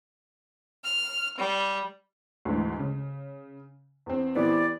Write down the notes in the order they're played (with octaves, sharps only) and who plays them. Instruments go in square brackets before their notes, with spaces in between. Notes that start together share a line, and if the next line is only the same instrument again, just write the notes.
[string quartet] F6
G3
[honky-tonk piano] D2 G#2 E3
C#3
E2 C4
[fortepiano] E3 B3 [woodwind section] G3 E4 D5